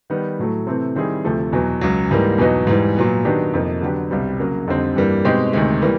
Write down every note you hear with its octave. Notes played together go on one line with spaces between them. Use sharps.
D#3 G3 B3
A2 F#3 A3
C3 E3 A3 C4
D#3 G3 C4 E4 G#4
D2 C3 F3 A3
E2 B2 F#3
C#2 C#3 F#3
G#2 E3 G3 A#3
E2 B2 F#3 B3 D#4
G#2 E3 G3
A#2 F#3 B3
D#3 F#3 B3 D4 G4
F2 C3 F3 A#3 D#4
D3 F#3 B3 D4 G4
C2 B2 G3 C4
C#3 F#3 A#3
F2 D3 G3 C4 D#4
G2 E3 G3 A#3
B2 G#3 C4 D#4 G4
D2 C3 D#3 G#3
E3 G3 A#3